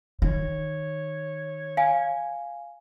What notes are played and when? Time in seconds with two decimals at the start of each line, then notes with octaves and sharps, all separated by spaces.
0.22 D#3 C#5
1.77 F5 G#5